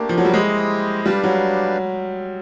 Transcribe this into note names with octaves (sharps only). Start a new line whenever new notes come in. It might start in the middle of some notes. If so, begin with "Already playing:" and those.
Already playing: A3 A#3 D4 G4
F3
F#3
G3
G#3 E4 G4 C5 D#5
G3 D4 G4 B4 D5 F5
F#3